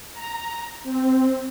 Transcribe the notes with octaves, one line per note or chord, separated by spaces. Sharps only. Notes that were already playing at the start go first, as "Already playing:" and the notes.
A#5
C4